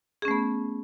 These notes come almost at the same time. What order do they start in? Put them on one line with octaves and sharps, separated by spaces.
G#4 C#4 A3 B3